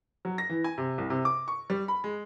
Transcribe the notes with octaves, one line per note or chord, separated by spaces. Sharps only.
F#3
A#6
E3
G#5
C3
C2
C3
D6
C#6
G3
B5
G#3